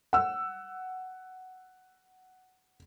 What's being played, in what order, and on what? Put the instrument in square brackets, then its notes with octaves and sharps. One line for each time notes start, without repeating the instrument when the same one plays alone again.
[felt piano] F#5 E6